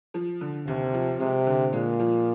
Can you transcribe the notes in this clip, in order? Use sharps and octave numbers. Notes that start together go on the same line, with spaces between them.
F3
D3
D#2 C3
F3
C3 G#3
D3
A#2 G#3
F3